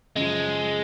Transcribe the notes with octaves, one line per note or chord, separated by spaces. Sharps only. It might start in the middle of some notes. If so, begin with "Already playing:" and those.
F#2 C#3 F3 G#3